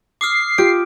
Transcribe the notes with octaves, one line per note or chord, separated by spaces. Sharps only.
D6 D#6 F6 C7
F4 G4 D7